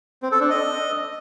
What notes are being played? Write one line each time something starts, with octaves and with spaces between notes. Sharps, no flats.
C4
A4
D4
D#5